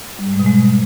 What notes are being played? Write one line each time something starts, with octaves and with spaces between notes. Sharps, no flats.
G3
G#2
G#3
B2
G#3